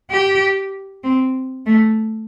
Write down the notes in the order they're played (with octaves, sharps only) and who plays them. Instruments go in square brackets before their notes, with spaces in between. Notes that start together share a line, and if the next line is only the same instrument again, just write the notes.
[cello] G4
C4
A3